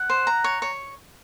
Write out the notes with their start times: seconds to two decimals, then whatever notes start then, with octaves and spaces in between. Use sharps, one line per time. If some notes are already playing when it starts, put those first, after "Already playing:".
Already playing: F#5
0.09 C5
0.27 A#5
0.44 C#5
0.62 C#5